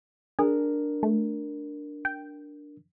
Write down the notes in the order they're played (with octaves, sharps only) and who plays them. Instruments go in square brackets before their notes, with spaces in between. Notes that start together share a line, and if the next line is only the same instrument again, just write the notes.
[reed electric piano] D4 A#4 [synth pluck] G#4
[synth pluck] A3
G5